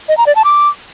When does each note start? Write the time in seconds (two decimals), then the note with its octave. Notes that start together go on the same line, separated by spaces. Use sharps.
0.09 D#5
0.18 A#5
0.27 D5
0.36 A5
0.44 D6